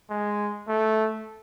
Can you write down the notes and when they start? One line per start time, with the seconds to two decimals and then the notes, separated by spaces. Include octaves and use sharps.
0.10 G#3
0.68 A3